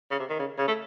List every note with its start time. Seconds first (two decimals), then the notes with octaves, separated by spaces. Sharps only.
0.11 C#3
0.20 C3
0.29 D#3
0.39 C#3
0.58 C#3
0.68 A3